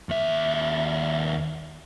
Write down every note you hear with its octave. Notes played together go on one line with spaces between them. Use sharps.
D#2 E5